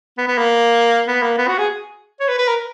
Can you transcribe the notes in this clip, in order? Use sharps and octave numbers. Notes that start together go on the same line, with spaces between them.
B3
B3
A#3
B3
A#3
B3
F#4
G#4
C#5
B4
B4
A#4